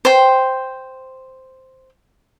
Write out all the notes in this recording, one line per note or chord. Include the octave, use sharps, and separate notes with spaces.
C5 G5